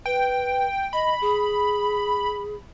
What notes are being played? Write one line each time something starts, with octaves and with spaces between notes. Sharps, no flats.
B4 G5
D#5 B5
G#4